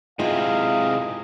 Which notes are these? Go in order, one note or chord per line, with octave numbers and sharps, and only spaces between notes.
G#2 C3 E4 F4 G#4 D#5 F5